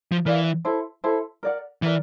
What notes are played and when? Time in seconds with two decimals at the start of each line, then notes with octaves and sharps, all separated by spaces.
0.12 F3
0.26 E3 A#4 D5 F5
0.65 E4 A4 C5
1.04 E4 A4 C5
1.43 A#4 D5 F#5
1.82 E3 A#4 D5 F#5